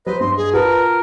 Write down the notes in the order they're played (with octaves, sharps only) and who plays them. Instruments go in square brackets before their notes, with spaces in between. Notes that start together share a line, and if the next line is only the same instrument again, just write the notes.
[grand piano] F#3 [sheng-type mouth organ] B4 D#5 [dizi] C5
[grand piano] G2 [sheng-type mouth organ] D#5 [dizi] C6
[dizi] G#4
[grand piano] F4 F#4 A5 [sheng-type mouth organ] A#4 [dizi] B4